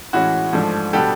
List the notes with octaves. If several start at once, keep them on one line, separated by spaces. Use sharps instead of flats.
A2 E3 G#3 C#4 F#4
G#2 F3 A3 D4
B2 G3 B3 D4 G4 A4